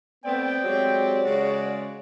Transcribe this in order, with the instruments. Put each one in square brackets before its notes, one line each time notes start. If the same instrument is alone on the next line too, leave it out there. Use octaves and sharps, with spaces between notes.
[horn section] A3 B3 C4 [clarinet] D5 [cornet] G5
[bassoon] F#3 [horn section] G#3 C4 G4
[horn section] C#3 G#3 [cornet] F#4